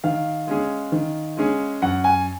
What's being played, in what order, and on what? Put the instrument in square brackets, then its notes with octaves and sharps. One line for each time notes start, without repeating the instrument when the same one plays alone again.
[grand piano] D#3 [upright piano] F5
[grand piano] G#3 C#4 G#4
D#3
G#3 C#4 G#4
[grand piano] F#2 [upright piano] F#5
[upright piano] G#5